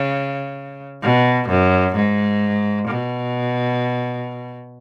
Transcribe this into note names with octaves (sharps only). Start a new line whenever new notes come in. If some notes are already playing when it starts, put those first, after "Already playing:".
Already playing: C#3
B2
F#2
G#2
B2